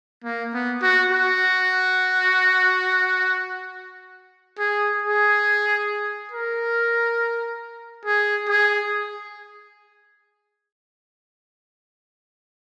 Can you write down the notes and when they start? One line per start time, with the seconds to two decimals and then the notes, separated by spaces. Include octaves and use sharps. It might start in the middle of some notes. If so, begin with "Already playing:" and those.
0.24 A#3
0.54 B3
0.82 F#4
1.11 F#4
4.58 G#4
5.02 G#4
6.32 A#4
8.05 G#4
8.49 G#4